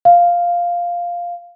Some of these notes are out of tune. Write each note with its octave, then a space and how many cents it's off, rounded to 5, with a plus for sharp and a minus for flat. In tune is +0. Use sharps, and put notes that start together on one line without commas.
F5 +0